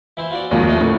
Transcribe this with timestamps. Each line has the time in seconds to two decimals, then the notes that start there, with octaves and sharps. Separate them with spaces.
0.17 E3 E4 C5
0.31 F4 F#4 D5
0.51 D#2 F3 G3 G#3 A#3
0.67 A3 D#4 C5
0.81 A2 D3